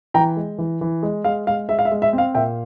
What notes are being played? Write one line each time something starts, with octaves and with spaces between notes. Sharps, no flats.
E3 G5 A#5
G#3
E3
E3
G#3
G#3 F5
G#3 F5
G#3 E5
F5
E5
G#3
E5
C4
F5
A#2 E5 G5